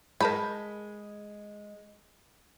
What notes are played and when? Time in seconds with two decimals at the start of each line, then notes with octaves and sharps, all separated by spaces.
0.21 G#3 A#4 A5 B5 G6